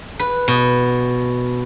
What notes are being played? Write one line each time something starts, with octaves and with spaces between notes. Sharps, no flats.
B4
B2